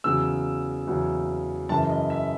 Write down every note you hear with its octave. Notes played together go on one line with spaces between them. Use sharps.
E2 C#3 F#3 E6
E2 C#3 F#3
F#2 C#3 E3 A5
D#5
E5